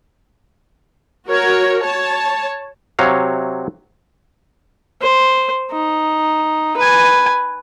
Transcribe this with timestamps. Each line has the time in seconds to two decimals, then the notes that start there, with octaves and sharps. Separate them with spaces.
1.27 F#4 A#4 C#5
1.82 C#5 A5
2.99 C3 F#3 C#5 F5
5.02 C5
5.72 D#4
6.77 B4 G#5